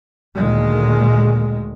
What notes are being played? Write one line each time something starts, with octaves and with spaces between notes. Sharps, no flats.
D2 A#2 D#3 G#3